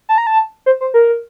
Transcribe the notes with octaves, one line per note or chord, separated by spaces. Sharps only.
A5
A#5
A5
C5
C5
A#4